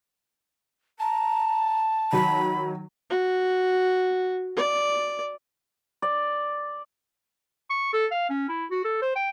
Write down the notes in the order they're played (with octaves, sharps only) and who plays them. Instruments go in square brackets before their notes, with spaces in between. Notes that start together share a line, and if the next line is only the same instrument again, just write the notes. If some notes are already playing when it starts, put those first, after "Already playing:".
[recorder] A5 [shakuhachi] A#5
[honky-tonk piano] D#3 F#3 F#4 [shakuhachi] B5
[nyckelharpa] F#4
D5
[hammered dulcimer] D5
[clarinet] C#6
A4
F5
C#4
E4
F#4
A4
C5
G5